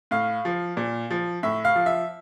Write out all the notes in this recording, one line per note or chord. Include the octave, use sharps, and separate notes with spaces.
A2 F5
F3
A#2
F3
A2 E5
F5
F3
E5